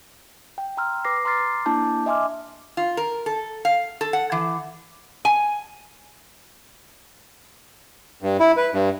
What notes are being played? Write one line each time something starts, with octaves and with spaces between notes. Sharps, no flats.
G5
G5 A#5 C6 E6 F6
B4 D6 A#6 C7
A#5 C6 D6 F6 A6 C7
A#3 D4 E4 A5 D6 G6
D#5 E5 G#5 C6 D6 F6
F4
A#4
A4
F5
A4
F#5
E3
G#5
G2
E4
B4
G2